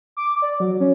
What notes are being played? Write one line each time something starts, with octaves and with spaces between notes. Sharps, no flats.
D6
D5
F#3
C#4